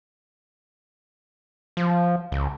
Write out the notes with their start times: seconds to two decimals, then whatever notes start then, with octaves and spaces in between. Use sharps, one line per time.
1.77 F3
2.32 C#2